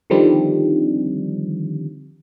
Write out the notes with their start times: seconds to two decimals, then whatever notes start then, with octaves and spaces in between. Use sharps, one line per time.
0.10 D3 D#3 F3 G3 C4 D4